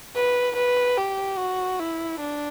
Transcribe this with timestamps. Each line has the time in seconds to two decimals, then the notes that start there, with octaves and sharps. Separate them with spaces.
0.15 B4
0.57 B4
0.98 G4
1.38 F#4
1.79 E4
2.20 D4